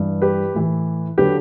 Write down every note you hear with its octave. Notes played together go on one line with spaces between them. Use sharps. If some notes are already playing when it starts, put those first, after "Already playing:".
Already playing: G2 E3
G4 B4
A2 E3
D3 F#3 G4 B4